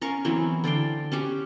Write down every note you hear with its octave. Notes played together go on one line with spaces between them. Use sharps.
C#4 A#4 F5 C#6
E3 F#3 B3 C4
D3 D5 F5 G5
C#4 F#4 G4